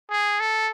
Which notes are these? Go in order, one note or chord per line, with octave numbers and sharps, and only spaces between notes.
G#4
A4